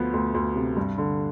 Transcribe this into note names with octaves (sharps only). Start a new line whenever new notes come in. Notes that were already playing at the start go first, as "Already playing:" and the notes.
Already playing: D2 F3 B3
D2
D2
C3
G2
D3